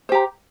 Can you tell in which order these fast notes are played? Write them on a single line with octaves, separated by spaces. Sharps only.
C5 G4 A#5